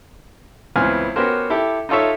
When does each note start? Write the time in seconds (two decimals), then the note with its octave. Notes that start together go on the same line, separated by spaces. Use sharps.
0.76 C#2 E3 B3 C4 G#5 F6
1.16 B3 C#4 F#4 G4 A#4 C5
1.50 E4 G4 A4
1.89 D#4 F4 A4 C#5 E5